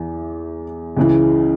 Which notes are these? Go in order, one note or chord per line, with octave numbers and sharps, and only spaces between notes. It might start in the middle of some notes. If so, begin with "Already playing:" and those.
Already playing: E2 E3
C#2 C#3 E3